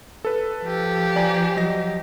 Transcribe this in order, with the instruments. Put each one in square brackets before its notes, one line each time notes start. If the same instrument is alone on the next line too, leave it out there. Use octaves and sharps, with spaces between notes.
[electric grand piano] A4 B4
[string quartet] F3 G4
[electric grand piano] D5 G#5 A#5
F#3 D#5 A#6